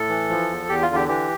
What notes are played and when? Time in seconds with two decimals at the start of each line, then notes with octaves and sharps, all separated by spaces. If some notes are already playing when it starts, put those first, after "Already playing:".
Already playing: A2 A4
0.09 E3
0.29 F3
0.50 E2
0.69 E2 G4
0.82 F4
0.89 D3
0.95 G4
1.08 E3 G4